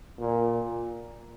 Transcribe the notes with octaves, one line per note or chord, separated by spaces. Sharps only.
A#2